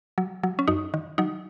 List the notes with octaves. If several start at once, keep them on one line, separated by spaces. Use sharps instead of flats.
F#3
F#3
C#4
F#2 D#4
D#3
F#3 D#4